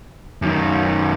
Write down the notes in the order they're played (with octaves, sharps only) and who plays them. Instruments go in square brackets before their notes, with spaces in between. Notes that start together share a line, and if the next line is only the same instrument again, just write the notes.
[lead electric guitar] F#2 D#3